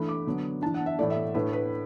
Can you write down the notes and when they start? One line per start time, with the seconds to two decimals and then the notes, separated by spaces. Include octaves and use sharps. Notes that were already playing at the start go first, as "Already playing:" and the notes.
Already playing: E3 A3 D4 B5
0.08 D6
0.26 D3 F#3 B3 D4
0.62 E3 D4 A5
0.74 F#5
0.86 E5
0.99 A2 E3 A3 D5
1.10 E5
1.34 A2 A3 D4 B4
1.53 B4